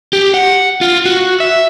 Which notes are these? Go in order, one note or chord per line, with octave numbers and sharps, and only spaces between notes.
G4
F#5
F4
F#4
E5